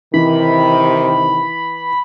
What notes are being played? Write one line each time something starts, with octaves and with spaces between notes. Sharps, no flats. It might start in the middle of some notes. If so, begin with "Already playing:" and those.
C3 D#3 E3 B5